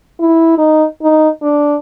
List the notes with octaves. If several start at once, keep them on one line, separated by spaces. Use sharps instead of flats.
E4
D#4
D#4
D4